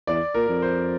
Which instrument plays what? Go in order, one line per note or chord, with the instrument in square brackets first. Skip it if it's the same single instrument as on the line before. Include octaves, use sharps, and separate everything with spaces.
[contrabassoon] E2 [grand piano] D5
[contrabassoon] A#2 [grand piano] A#4
[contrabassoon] F2
[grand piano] C5